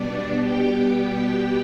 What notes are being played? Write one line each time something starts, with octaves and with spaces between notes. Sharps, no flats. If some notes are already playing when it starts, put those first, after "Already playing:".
Already playing: B2 G3 B3 D4 D5
G4 G5
G4 G5